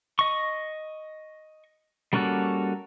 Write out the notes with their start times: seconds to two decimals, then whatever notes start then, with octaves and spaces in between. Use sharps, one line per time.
0.19 D#5 C#6
2.13 G3 A#3 C#4 F#4 A4